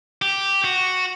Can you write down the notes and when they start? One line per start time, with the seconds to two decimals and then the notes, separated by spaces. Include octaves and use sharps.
0.22 G4
0.64 F#4